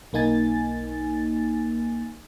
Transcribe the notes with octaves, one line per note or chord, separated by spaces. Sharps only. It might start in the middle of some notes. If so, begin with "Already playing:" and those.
B1 A#3 D#4 G#5 A6